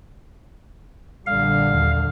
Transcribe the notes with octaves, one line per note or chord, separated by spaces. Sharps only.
A#1 D3 G3 F5
D#2